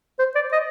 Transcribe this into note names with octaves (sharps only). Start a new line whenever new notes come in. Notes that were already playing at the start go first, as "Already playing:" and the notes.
C5
D5
D#5